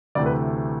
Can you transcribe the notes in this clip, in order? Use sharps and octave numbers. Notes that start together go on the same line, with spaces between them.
D2 C3 E3 A3 D5
B4